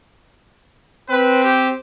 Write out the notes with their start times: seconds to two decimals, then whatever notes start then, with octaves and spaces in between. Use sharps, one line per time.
1.09 C4 B4
1.44 G4